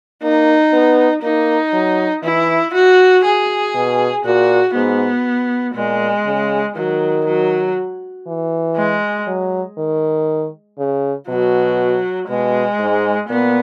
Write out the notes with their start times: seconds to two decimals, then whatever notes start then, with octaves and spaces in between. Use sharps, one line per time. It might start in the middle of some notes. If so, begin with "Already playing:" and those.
0.22 A#3 D#4
0.73 B3
1.23 A#3 D#4
1.73 F#3
2.23 E3 E4
2.74 F#4
3.25 G#4
3.74 B2
4.25 A#2 F#4
4.75 G#2 B3
5.75 A#2 G#3
6.26 C#3
6.76 D#3 F#3
7.26 F#3
8.27 E3
8.76 G#3
9.27 F#3
9.77 D#3
10.78 C#3
11.28 B2 F#3
12.29 B2 G#3
12.79 G#2
13.29 A#2 B3